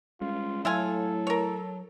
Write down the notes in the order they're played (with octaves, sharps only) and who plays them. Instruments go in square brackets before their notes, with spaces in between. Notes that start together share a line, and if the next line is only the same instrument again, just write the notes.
[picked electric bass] G3 G#3 C#4 [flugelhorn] F4
[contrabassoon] A2 [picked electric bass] F#3 [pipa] E4 F4 G#5 [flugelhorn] A4
[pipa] A#4 C#5